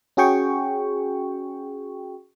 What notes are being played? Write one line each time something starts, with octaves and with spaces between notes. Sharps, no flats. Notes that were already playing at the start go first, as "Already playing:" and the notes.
C#4 F#4 G#4 G5 C#6